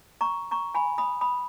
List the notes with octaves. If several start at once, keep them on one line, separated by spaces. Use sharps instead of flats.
A#5 C#6
A#5 C#6
G#5 B5
B5 D#6
B5 D#6